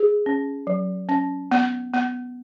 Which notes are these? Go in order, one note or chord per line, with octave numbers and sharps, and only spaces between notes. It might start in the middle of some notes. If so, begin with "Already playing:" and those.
Already playing: G#4
C#4
F#3
C#4
B3
B3